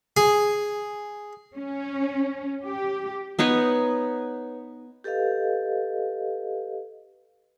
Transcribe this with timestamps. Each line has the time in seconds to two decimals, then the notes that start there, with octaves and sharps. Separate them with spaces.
0.17 G#4
1.55 C#4
2.66 G4
3.39 B3 D#4 B4 C#5
5.04 G4 A4 B4 D#5 F5